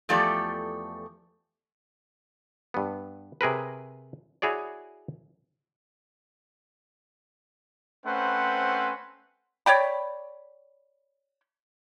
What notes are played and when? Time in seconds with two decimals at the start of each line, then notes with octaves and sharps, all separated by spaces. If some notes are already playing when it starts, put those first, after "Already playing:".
0.09 E2 F3 A3 G4 A4 D5
2.74 G2 B3
3.41 C3 G#4 A#4 B4
4.42 E4 F#4 G#4 C#5 D5
8.05 A3 C4 C#4 B4 C5 F#5
9.66 C#5 D5 G5 B5